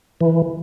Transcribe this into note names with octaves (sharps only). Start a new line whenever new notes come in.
E3